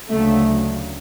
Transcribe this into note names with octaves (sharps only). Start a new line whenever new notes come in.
D2 C#3 F#3 A3